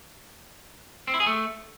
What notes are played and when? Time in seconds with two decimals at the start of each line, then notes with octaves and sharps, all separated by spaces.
1.07 C4
1.14 E4
1.20 G#4
1.26 A3